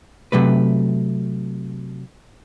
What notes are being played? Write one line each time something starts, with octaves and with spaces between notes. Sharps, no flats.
C3 F#3 A3 B4